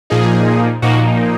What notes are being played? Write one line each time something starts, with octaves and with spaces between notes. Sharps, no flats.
A#2 F3 A#3 D#4 G#4
A#2 F3 A#3 D#4 F#4